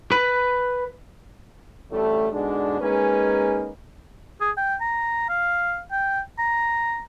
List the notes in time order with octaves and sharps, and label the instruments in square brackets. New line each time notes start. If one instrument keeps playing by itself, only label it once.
[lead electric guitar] B4 B5
[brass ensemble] A1 D2 G3 A3
G#2 B2 D3 G#3 D4
G#3 A#3 C#4 D#4 B4 G#5
[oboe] G#4
G5
A#5
F5
G5
A#5